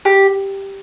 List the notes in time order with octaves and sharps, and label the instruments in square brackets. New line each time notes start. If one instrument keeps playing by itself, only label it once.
[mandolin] G4